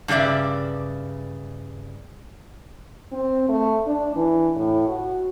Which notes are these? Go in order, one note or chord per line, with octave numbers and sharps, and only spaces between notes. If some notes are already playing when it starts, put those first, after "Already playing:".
G2 C#3 A3 D5 E5
C4
A3
D4
E3
A2
F#4